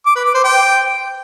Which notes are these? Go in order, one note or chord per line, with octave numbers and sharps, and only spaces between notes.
D6
B4
D6
C5
G5